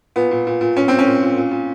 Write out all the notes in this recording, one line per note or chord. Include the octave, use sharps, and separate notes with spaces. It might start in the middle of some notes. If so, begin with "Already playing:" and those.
A#2 B3
A#2
A#2
A#2
A#2 C#4
A#2 C4
C#4
A#2
A#2
A#2
A#2